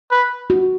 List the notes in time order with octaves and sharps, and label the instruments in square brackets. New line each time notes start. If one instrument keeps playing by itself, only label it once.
[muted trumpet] B4
[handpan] F#4